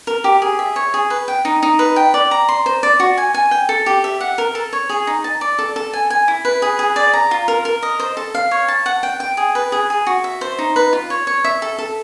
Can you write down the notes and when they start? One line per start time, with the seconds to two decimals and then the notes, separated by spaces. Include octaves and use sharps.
0.07 A#4
0.24 G4
0.42 G#4
0.59 E5
0.76 C#5
0.94 G#4
1.10 B4
1.28 G5
1.45 D#4
1.63 D#4
1.79 B4
1.96 G5
2.14 D5
2.31 A#5
2.49 C6
2.66 C5
2.83 D5
3.00 F#4
3.17 G#5
3.34 G#5
3.51 G5
3.69 A4
3.86 G4
4.04 E5
4.21 F#5
4.38 A#4
4.55 A4
4.73 C#5
4.89 G#4
5.07 D#4
5.24 A5
5.41 D5
5.59 A4
5.76 A4
5.93 G#5
6.10 G#5
6.28 E4
6.45 B4
6.62 G#4
6.79 G#4
6.96 D5
7.13 A#5
7.31 F4
7.48 A#4
7.65 A#4
7.83 D#5
8.00 C5
8.17 A4
8.35 F5
8.51 C#5
8.68 A5
8.86 F#5
9.03 G5
9.20 G5
9.37 G#4
9.55 B4
9.72 G#4
9.90 G#4
10.07 F#4
10.24 E5
10.41 C5
10.59 D#4
10.76 B4
10.93 F4
11.10 C#5
11.27 C#5
11.44 E5
11.62 A4
11.79 A4